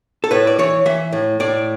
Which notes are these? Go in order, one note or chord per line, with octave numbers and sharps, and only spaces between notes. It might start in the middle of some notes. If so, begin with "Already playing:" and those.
A4
A2 B4
D5
E3 C#5
E3 E5
A2
A2 D5